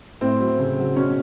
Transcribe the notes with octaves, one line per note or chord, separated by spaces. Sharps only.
A2 C4
F#3
C#3
F#3
B2 C#4